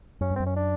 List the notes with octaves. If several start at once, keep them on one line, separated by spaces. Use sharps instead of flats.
F#2 C#4
G2
F#2 C4
C#4
D4